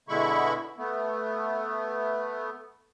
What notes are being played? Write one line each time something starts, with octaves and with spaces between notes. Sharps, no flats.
B2 D3 G#3 E4 B5 C#6
A3 B3